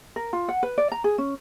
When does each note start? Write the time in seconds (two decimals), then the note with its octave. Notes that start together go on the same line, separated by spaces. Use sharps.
0.16 A#4
0.33 F4
0.49 F#5
0.63 B4
0.78 D5
0.92 A#5
1.04 G#4
1.18 C#4